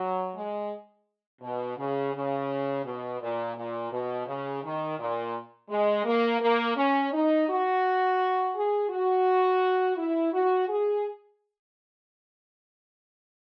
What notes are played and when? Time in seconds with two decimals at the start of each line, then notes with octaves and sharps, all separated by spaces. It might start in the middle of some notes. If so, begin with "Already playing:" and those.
Already playing: F#3
0.35 G#3
1.42 B2
1.77 C#3
2.14 C#3
2.84 B2
3.21 A#2
3.56 A#2
3.91 B2
4.27 C#3
4.63 D#3
4.98 A#2
5.70 G#3
6.05 A#3
6.40 A#3
6.76 C#4
7.13 D#4
7.48 F#4
8.55 G#4
8.90 F#4
9.97 E4
10.33 F#4
10.68 G#4